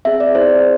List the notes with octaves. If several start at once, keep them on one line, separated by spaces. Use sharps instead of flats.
C4 G#4 E5
D5
C4 E4 G#4 C5